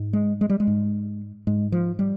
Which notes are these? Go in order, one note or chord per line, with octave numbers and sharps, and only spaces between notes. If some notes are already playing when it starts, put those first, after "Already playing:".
Already playing: G#2
G#3
G#3
G3
G#3
G#2
G#2 G#3
F3
G3